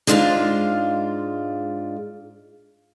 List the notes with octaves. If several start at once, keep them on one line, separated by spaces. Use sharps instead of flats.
G#2 G#3 D4 F4 F#4 F5